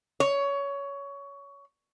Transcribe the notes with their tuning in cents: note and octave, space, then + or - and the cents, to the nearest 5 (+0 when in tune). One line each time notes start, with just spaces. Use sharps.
C#5 +20